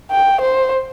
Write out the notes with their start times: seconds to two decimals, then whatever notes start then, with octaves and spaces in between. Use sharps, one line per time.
0.11 G5
0.41 C5